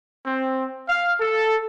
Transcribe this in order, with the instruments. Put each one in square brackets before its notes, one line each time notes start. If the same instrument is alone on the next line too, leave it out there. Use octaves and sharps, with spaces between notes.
[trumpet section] C4
F5
A4